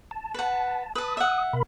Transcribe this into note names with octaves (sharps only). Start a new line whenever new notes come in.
A5
B4 F#5
B4 A5 D#6
E5 F#5
B2 A#4 B5